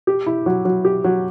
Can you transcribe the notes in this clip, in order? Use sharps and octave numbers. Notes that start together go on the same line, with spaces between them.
G4
E4
F#3
F#3
G4
F#3